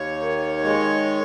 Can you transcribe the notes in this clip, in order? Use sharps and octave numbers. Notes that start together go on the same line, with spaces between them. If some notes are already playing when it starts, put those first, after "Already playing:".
Already playing: D#2 C#5
D#3
G#3